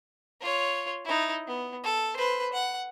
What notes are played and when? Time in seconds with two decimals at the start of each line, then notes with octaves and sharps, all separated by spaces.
0.41 F4 C#5
1.05 D#4 E4
1.47 B3
1.84 A4
2.16 B4 C5
2.53 F#5